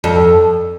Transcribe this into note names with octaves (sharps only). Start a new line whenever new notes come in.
F2